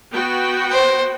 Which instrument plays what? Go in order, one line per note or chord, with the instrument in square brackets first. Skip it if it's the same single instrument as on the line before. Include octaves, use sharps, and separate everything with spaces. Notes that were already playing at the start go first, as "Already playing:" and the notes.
[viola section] B3 F#4 G5
[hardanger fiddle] C5